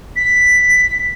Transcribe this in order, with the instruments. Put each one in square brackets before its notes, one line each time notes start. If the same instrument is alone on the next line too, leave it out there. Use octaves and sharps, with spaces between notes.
[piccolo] B6